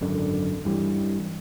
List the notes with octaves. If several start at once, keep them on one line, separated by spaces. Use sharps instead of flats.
G#1 F#2 D3
G2 E3 G3